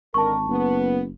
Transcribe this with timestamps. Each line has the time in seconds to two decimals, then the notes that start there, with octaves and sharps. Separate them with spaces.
0.14 G#1 D3 D#4 A#4 A5 C#6
0.48 F#1 B3